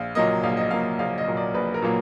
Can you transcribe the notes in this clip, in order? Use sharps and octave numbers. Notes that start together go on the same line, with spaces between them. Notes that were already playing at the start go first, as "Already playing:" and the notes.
Already playing: A#1 F5
A#2 F#3 A#3 D#5
A#1 F5
D#5
A#2 F#3 A#3 F5
A#1 F5
D#5
A#2 F#3 A#3
D5
A#1 B4
A#4
A#2 F#3 A#3